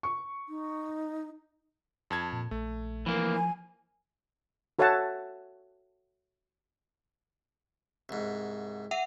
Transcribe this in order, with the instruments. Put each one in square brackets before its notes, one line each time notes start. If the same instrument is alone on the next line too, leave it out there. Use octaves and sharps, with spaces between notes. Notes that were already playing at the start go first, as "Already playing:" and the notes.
[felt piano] C#6
[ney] D#4
[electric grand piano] F2 A5 G#6
[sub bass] A#2
[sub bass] A#1 [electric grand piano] A3
[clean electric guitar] E3 A#3 [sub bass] F3
[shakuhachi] G#5
[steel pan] F#4 A4 C#5 E5 F#5 A5
[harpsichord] C2 G#2
[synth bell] E5 F#5